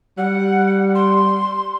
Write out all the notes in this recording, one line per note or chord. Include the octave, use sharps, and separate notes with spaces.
G3 F#5
C6